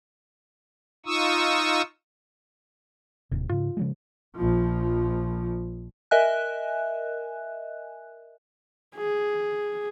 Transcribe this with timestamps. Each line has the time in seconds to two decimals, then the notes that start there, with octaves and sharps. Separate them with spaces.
1.06 D#4 F4 C#6 D#6 E6
3.32 D#1 D#2 A2 C3
3.50 G#2 C#3 F4
3.77 C#3 F3 G#3
4.36 A#1 F3
6.11 A#4 D#5 E5 G#5 F#6
8.96 G#4